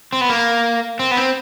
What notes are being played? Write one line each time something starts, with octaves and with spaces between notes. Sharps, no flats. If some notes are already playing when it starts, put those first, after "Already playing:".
C4
B3
A#3
C4
B3
C4